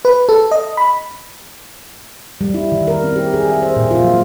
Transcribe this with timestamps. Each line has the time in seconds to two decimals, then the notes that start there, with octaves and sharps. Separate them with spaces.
0.05 B4
0.29 A4
0.51 D#5
0.77 B5
2.41 G3
2.54 E4
2.72 D#3
2.87 A#4
3.04 C4
3.16 G4
3.34 G#4
3.49 E5
3.62 C5
3.76 A#2
3.91 F4
4.05 F#3